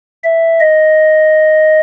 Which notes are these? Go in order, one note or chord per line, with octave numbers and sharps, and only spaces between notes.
E5
D#5